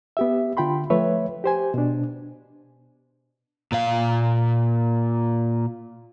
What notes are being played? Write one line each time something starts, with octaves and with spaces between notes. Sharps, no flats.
B3 G4 E5
D3 F4 G5 B5 C6
F3 A3 B4 C#5 E5
G4 C5 G#5
B2 D4
A#2 F5